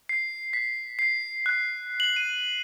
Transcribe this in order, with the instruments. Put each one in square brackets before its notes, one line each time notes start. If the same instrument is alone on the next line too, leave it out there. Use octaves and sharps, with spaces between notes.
[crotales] C7
B6
C7
F#6
F#7
D#7